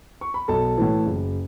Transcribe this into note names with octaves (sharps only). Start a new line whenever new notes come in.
C#6
B5
B1 A4 A5
A2 E3
F#1